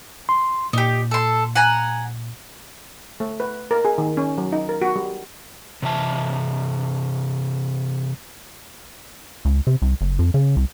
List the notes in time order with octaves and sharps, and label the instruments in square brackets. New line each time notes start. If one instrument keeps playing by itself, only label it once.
[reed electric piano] C6
[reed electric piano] A#2 [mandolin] D#4 G4
[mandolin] A4 C6
F#5 G#5 A#5
[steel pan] A3
B4
A#4
G#4
D#3
C#4
F#3
D#4
A#4
F#4
G3
[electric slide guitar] C3 E3 E5 A5
[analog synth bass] C#2
C3
C2
F#1
F2
C#3
C2